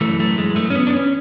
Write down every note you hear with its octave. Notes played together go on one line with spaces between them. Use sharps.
F#2 E3 A3
A3
G#3
A3
C#4
B3
D4
C#4